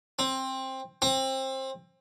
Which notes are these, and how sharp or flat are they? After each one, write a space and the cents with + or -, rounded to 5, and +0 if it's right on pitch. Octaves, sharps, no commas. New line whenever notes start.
C4 +15
C4 +25